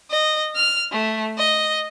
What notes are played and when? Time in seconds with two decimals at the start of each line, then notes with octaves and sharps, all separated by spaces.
0.11 D#5
0.56 F6
0.92 A3
1.38 D#5